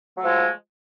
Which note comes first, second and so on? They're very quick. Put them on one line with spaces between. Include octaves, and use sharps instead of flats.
F#3 A3 F3 G#3